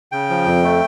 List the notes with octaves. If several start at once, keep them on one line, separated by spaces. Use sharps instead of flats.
C#3 G5
F3
F2
A3